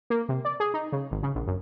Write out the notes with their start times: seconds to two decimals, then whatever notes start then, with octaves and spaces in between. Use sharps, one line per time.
0.10 A#3
0.29 C3
0.45 D5
0.60 G#4
0.74 D#4
0.92 C#3
1.11 G#1
1.23 C#3
1.35 A#1
1.47 F#2